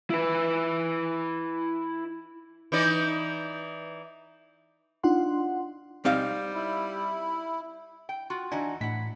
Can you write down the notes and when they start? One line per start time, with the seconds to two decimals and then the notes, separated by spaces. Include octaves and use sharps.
0.10 E4 B4
2.72 E3 D#4 D5
5.04 D4 D#4 F4 F#5 C6
6.05 G3 C4 D#4 F5
6.55 E4
8.09 G5
8.30 F4 F#4
8.52 E3 D4 D#4 F#4 G#5
8.81 A2 E3 F#5 B6